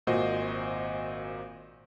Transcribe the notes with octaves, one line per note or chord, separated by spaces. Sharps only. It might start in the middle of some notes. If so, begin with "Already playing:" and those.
G#1 A#2 F#4 C5 D#5